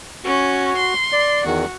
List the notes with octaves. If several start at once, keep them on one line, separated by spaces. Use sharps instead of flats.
C#4 F#4
C6
D5
E2 D#3 F#4